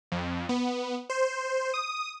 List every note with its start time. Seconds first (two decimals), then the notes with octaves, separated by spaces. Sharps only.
0.12 F2
0.49 B3
1.10 C5
1.74 D#6